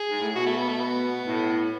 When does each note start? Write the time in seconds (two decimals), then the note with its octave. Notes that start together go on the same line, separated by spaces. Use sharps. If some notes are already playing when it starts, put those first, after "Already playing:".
Already playing: G#4
0.10 G#2
0.20 A2
0.35 B2 F#4
0.46 A3
0.58 B3
0.68 A3
0.80 B3
1.26 A2